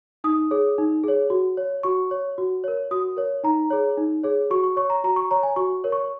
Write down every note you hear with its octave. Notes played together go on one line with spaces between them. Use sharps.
D#4 D#6
G#4 C#5
D#4
G#4 C#5
F#4
C#5
F#4 C#6
C#5
F#4
A#4 C#5
F#4 D#6
A#4 C#5
D#4 A#5
G#4 C#5
D#4
G#4 C#5
F#4 C#6
C#6
C#5 C#6
A#5
F#4 A#5
C#6
C#5 A#5
G#5
F#4 C#6
A#4 C#5
C#6